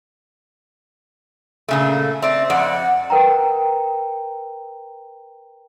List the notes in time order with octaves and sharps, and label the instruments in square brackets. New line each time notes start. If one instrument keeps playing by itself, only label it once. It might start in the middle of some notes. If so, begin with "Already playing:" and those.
[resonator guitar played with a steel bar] A#2 C#3 A3
[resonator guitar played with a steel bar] C4 D5 [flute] E5
[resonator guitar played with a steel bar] F2 D5 [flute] F#5
[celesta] A#4 B4 G5 A#5